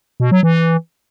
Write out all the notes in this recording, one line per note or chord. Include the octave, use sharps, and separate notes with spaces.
B2
F#3
E3